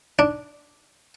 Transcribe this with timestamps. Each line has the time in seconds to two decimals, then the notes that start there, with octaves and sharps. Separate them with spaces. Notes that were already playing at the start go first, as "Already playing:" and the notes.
0.19 D4